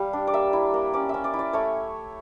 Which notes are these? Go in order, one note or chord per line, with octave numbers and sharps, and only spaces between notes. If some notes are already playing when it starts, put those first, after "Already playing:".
Already playing: G3 F5
D4
D5
A#3 E5
E4
A#3
C#4 D5
C#4 E5
D5
E4
D5
A3 C#5